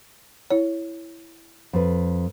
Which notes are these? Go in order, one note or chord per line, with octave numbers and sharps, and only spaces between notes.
E4 C#5
F2 B4